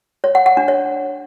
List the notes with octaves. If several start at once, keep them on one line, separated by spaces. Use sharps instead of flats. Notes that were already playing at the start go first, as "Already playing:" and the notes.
C#5
F#5
F#5
D4
C#5